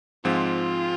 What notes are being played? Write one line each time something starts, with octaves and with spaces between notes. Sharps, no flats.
G#2 F3 G#3 C4 F4